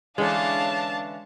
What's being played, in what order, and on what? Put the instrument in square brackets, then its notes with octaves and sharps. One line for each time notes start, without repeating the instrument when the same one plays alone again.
[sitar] D3 E3 C#4 [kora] G#3 [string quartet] D4 A5 [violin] F5